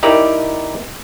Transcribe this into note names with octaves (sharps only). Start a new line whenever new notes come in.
D#4 E4 G4 A#4 D5